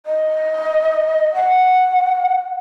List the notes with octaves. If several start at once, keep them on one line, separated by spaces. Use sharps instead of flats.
D#5
F#5